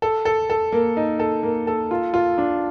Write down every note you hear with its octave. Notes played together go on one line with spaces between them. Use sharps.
A4
A4
A4
A#3
D#4
A4
A#3
A4
F4
F4
D4